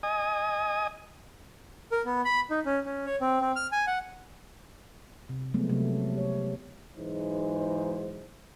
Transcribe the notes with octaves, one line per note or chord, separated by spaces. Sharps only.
D#5 G#5 D#6
A#4
B3
B5
D#4
C#4
C#4
C#5
C4
C4
F6
G#5
F#5
C3
F3 F#3 G#3 A3 B3
C3 F#3 A3
G4 C#5
B1 G#2 E3 G#3 D#4 C5